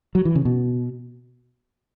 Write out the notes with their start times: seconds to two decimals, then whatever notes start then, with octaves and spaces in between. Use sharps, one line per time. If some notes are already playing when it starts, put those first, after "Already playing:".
0.15 F#3
0.25 E3
0.35 C#3
0.45 B2